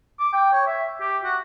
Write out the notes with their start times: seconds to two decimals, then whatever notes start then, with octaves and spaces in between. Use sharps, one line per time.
0.20 D6
0.33 G5
0.52 C#5
0.66 E5
1.01 G4
1.23 F#4